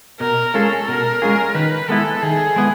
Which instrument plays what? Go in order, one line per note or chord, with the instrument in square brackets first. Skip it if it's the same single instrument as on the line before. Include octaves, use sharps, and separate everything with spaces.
[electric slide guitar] B2 [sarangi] A#4
[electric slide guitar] G#3 C#4 F4 G#4 [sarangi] A4
[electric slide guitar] B2 [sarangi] A#4
[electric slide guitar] G#3 C#4 F4 G#4
[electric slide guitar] D#3 [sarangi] B4
[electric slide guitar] G#3 B3 E4 [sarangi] A4
[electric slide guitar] D#3 [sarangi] G#4
[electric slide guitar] G#3 B3 E4